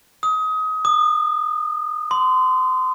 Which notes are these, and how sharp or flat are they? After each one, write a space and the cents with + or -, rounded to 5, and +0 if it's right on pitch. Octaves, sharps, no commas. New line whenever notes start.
D#6 +25
D#6 -35
C6 -30